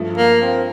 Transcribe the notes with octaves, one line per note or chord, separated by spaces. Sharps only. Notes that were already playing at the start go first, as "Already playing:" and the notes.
Already playing: G2 F3 A3
A#3
C4